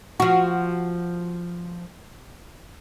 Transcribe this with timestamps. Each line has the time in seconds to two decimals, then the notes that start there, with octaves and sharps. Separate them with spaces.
0.20 F3 F#4